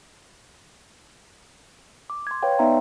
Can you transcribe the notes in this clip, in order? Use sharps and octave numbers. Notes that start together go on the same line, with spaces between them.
D6
C6 G#6
B4 C#5 F5 G5
B3 D#4 D5 E5 A#5 C6